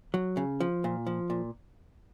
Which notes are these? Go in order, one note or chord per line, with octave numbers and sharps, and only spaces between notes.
F#3
C#3
F3
A#2
F3
A#2